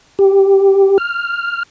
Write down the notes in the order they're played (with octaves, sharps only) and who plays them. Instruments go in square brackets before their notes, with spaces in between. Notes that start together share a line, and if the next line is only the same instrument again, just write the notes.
[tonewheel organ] G4
F6